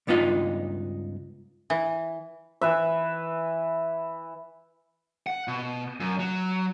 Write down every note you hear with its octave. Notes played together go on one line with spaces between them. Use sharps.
C#2 G2 B3 D#4 F4 D#5
E3
E3 B4 E5
F#5
B2
F#2
F#3